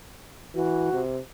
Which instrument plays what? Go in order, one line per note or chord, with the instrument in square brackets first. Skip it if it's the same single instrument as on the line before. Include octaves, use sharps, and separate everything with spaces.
[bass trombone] E3 [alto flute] F#4
[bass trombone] C3